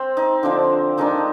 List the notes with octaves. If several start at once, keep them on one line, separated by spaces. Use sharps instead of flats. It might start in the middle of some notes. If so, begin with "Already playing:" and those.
Already playing: C4 C5
D#4
D3 F3 C4 D4
D#3 G#3 D4 D#4